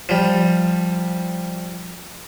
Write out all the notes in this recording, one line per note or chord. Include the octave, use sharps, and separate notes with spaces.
F3 G3